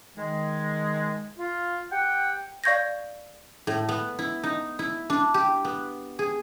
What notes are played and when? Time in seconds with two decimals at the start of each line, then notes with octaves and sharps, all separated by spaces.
0.17 D#3 G#3
1.38 F4
1.92 G4 F#5 G5
2.64 D5 F5 C#6 G6 G#6 A#6
3.67 A2
3.89 B3
4.19 E4
4.43 D#4
4.79 E4
5.10 D4
5.34 G4
5.65 B3
6.19 G#4